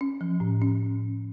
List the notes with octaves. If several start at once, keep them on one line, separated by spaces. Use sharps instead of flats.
C#4
F3
A2
C#4